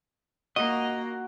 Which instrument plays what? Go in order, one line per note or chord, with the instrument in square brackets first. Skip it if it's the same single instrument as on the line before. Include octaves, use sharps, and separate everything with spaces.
[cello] A#3 [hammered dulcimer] F#4 [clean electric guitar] D#5